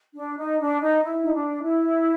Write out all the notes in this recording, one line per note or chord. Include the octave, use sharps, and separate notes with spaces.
D4
D#4
D4
D#4
E4
D#4
D4
E4